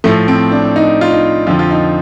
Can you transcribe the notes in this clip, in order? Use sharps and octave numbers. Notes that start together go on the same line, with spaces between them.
A2 F3 A3
C4
D4
D#4
F4
D#4
F2 D3 F3 F4
F4
D#4